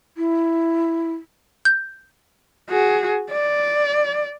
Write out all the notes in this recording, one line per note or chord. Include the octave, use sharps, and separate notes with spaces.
E4
G6
F#4 G#4
D5